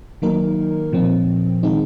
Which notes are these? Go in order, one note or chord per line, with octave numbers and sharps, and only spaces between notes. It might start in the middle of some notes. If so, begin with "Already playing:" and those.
D#3 F#3 A#3 D#4 A#4
A#2 F3 C4
D#3 G#3 C4 D#4 G#4